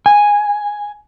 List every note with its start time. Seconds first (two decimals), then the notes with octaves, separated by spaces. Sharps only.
0.06 G#5